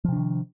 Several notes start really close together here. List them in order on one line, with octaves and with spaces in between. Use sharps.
F3 C3 D4 D#3